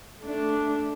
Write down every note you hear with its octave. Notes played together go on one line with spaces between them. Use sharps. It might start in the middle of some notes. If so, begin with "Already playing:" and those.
A3 D4